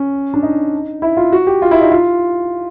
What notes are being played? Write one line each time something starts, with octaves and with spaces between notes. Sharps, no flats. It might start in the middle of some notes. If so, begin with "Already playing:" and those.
Already playing: C#4
D4
D#4
E4
F4
F#4
G4
F4
E4
D#4
F4